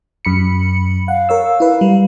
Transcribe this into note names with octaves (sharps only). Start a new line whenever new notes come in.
F#2 B5 C#7
F5 F#5
A#4 C#5 E6
E4 B4
G3